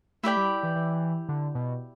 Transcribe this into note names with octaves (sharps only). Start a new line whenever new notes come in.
A3 E4 G4 D5 G5
G3
E3
E3
D3
B2